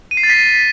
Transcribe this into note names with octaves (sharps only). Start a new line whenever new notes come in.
D#7
C7
A6
B6